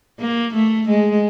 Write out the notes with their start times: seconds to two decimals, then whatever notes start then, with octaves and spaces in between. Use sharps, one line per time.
0.20 A#3
0.54 A3
0.89 G#3